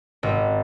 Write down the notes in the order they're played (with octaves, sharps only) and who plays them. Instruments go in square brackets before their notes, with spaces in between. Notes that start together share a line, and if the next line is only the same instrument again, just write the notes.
[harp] G#1